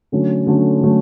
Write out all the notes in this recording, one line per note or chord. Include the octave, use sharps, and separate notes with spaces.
D3 F#3 A3 C#4
D3 F#3 A3 C#4
D3 F#3 A3 C#4